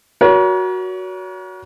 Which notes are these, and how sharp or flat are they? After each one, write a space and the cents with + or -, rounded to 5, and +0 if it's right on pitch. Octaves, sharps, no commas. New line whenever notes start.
F#4 +0 A#4 +40 C#5 +35